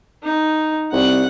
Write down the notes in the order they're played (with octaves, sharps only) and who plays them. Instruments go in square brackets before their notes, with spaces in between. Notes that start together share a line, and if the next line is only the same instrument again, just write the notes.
[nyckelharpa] D#4
[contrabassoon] C2 [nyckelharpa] F#5